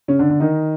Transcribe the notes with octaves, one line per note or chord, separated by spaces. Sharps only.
C#3 C#4
D3 D4
D3 D4
D#3 D#4